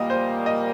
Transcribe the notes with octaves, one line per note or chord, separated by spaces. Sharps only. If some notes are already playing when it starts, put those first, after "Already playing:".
Already playing: A#2 G3 A#3 D#5
C5
D#5